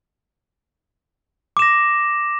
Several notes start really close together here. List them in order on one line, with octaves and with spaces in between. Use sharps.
D6 E7 A#6